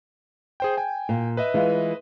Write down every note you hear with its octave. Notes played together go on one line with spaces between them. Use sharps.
G#4 C5 G5
G5 G#5
A#2
B4 D#5 E5
E3 G#3 F4